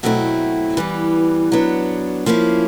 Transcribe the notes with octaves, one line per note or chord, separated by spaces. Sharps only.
B2 F#3 A3 C4 E4
E3 G3 B3
F#3 B3 D4
F3 A#3 C#4 E4